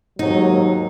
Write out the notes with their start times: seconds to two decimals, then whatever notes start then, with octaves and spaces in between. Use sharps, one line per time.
0.19 D#2 G#2 F#3 D#4